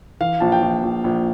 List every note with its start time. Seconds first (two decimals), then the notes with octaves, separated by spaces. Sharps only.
0.20 E3 F5
0.40 A#1 A5
0.52 G5
0.62 A#1
0.83 A#1
1.04 A#1